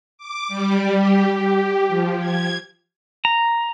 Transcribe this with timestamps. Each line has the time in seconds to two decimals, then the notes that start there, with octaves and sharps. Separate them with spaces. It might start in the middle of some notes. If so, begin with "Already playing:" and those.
0.18 D6
0.48 G3
0.95 G4
1.35 G4
1.88 F3
2.20 G#6
3.25 A#5